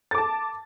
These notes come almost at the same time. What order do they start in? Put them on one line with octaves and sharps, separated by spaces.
A6 D6 A5